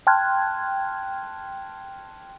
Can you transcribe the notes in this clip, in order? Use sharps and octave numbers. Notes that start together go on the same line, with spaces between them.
G5 A5 C6 F6 F#6 G#6